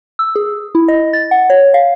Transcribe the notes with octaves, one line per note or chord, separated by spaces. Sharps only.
E6
G#4
E4
D#5
A6
F#5
C#5
F5